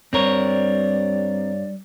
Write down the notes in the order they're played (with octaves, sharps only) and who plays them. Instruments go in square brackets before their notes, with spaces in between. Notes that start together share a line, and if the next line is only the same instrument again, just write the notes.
[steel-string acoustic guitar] G2 C#5 [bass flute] G3 [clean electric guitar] C4 A#4 [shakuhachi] D5